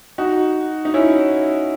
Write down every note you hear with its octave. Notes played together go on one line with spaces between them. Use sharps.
D#4 F#4
D#4
C#4 E4